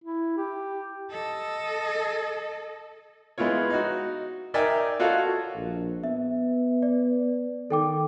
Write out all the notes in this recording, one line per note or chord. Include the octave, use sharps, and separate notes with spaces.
E4
G4
A4 D#5
G#3 B3 E4 F4 C#5
D#4 F#4
D#4 A#4 D5 E5 G5 G#5
F4 F#4 A4 C#5 D#5 F5
A#1
B3 E5
D5
D#3 A4 G5 D6